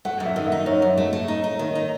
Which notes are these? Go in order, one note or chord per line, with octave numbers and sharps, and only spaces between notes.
A3 F#5
F#2
E5
D#3
E5
D#4
F#2 C#5
F#2
A3
A3
D#4
D#4
D#3
D#4